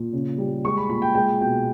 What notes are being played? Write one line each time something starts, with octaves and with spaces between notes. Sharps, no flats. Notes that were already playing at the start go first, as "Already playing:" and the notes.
Already playing: A#2
C#3
G3
G#3 C#6
B5
A#2 B5
G5
G#3 G5
B2 G5